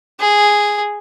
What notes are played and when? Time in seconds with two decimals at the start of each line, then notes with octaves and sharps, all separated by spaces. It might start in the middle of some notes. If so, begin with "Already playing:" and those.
0.20 G#4